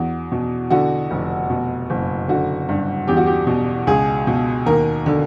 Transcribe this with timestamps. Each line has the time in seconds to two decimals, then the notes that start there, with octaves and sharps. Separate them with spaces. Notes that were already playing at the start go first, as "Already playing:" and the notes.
Already playing: E2 F#4
0.32 B2
0.70 D3 F#4
1.11 F1
1.50 B2
1.90 F#1
2.28 D3 F#4
2.69 G2
3.07 E2 G4
3.17 F#4
3.26 G4
3.47 B2
3.87 C#2 G#4
4.27 B2
4.66 D#2 A#4
5.06 D3